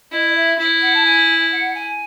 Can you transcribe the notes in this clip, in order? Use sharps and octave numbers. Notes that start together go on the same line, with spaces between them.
E4 D#5
D#5
E5
E4
F#5
A5
G#5
F#5
G#5